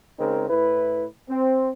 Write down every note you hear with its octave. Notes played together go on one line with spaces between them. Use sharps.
C#3 G#3 C4 D#4 A#4
A2 E4 B4
C4